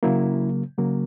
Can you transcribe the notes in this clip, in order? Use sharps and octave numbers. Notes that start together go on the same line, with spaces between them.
C#3 F#3 A#3 E4
C#3 F#3 A#3